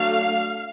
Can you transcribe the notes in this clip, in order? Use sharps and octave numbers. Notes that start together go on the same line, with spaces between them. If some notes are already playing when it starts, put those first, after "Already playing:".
Already playing: F#3 A3 D4 F5